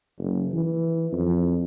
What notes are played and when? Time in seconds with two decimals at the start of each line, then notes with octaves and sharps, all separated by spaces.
0.18 F#1
0.53 E3
1.12 F2